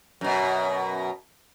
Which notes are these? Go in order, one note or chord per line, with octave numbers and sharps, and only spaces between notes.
F#2 B2